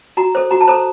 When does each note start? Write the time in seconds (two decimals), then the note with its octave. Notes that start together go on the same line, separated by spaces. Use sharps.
0.17 F#4 A#5
0.35 A4 C5
0.51 F#4 A#5
0.61 A5
0.67 A4 C5 A#5